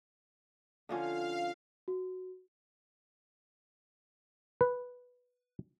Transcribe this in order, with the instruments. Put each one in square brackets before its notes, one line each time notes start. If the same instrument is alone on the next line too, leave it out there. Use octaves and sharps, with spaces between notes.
[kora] D3 F3 C#4 [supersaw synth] F5
[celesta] F#4
[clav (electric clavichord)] B4